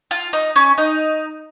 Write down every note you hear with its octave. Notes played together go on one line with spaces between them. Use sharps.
F4
D#4
C#4
D#4